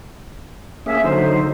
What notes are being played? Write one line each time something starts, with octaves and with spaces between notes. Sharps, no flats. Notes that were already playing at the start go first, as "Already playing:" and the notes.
A#3 C#4 G#4 E5
D3 F#3 D#4 C5